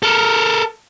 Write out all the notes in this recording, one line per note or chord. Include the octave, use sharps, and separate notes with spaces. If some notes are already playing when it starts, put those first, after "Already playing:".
A4 A#4